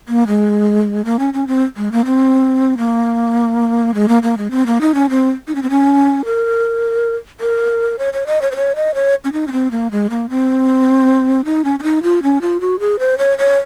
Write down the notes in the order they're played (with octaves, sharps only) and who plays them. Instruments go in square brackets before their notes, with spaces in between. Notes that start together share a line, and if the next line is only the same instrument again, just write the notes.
[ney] A#3
G#3
A#3
C#4
C#4
C4
G#3
A#3
C4
A#3
G#3
A#3
A#3
G#3
C4
A#3
D#4
C#4
C4
D#4
C#4
C4
C#4
A#4
A#4
C#5
C#5
D#5
C#5
C5
C#5
D#5
C#5
C#4
D#4
C#4
C4
A#3
G#3
A#3
C4
D#4
C#4
C#4
D#4
F4
C#4
F4
F#4
G#4
C5
C#5
C#5